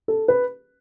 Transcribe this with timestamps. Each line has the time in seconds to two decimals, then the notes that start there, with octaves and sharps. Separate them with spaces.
0.08 A4
0.28 B4